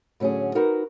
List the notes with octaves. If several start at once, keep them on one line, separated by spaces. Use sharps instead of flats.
A2 D3 F#3 C#4 G#4
D#4 F#4 A#4 B4